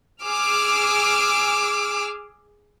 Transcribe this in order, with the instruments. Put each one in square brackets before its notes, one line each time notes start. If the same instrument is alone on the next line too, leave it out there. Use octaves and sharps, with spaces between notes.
[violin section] G#4 D6 E6 F6